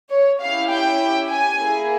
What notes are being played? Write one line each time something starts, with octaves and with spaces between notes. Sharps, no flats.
C#5
C#4 E4 G4 F5
G5
G#5
A#3 E4 G#4